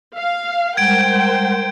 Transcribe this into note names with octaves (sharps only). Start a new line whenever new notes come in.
F5
G3 G#3 A#4 C5 F#5 G5 G#6 D7